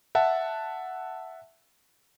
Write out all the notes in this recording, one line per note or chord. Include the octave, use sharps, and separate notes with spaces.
E5 F#5 A5